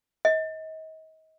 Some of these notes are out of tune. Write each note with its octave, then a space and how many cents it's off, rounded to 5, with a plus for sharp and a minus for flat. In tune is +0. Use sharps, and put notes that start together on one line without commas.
D#5 +35